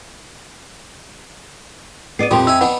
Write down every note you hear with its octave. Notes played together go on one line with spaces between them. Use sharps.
B3 D5 C7 D#7
F2 A#2 G3 G4 C6 D#6
D#4 E5 G#5 E6
B3 D4 D#4 F#5